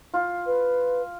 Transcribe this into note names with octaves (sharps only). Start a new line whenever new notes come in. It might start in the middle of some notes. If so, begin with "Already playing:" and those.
F4
B4